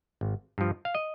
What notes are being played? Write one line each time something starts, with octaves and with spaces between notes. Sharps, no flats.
G#1
G2 F3
F5
D#5